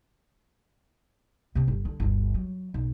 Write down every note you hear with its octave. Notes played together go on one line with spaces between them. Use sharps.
C3 C4
G1
D3
G1 D2
F#3
B1